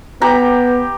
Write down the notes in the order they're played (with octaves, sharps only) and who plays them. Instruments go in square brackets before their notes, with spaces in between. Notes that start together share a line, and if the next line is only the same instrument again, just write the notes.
[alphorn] B3 [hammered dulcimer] G4 A#5